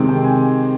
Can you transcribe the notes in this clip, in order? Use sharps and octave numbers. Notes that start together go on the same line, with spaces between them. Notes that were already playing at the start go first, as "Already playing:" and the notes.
Already playing: C3 D#3 G#3 C4
G5
G#5